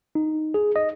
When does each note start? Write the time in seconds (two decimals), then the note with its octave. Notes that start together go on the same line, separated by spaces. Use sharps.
0.15 D#4
0.54 G#4
0.76 D#5